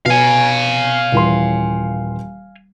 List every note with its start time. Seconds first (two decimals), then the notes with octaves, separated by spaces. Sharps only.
0.06 B2 F5 G#5
1.12 D#1 E3 C6